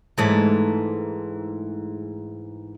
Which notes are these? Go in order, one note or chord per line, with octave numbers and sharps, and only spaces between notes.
G#2 E3 A3